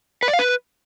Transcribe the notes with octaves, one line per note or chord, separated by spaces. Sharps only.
B4
D5
F5
B4